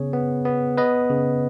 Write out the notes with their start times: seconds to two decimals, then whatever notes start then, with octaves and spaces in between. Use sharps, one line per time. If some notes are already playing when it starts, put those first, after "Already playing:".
Already playing: C#3 B3 G#4 C#5
0.14 B3
0.45 B3
0.78 B3 B4 D#5
1.10 C#3